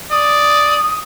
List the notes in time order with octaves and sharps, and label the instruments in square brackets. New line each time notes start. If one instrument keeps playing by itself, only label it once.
[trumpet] D5 [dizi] D#6